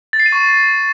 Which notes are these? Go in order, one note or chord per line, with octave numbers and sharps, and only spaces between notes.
A6
C7
D#7
C#6